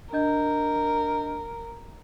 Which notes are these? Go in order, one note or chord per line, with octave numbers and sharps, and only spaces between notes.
D4 A#4 D#5 G6